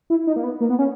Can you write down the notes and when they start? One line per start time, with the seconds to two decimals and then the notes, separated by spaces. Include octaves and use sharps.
0.10 E4
0.27 D#4
0.36 A#3
0.44 B3
0.60 A#3
0.70 B3
0.79 C#4